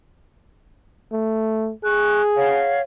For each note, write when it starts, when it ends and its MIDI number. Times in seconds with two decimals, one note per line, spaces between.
1.12 1.72 57
1.84 2.77 68
1.84 2.21 85
1.84 2.21 90
2.36 2.82 73
2.36 2.82 77
2.36 2.82 78